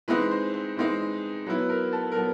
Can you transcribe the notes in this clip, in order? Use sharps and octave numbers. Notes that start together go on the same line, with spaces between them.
E3 G#3 C4 D#4 B4
C5
C5
E3 G#3 C4 D#4
F#3 B3 E4 B4
B4
A#4
A4
A#4
F#3 B3 A4